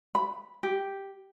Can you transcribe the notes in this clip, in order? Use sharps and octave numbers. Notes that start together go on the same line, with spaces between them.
B5
G4